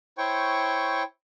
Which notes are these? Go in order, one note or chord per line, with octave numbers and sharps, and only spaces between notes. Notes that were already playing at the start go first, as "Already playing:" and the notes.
E4 C5 C#5 G5 C#6